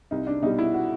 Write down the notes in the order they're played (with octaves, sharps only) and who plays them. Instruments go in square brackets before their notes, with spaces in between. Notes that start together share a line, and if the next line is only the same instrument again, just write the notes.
[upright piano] C2 D#4
D4
B2 G3 D#4
E4
F#4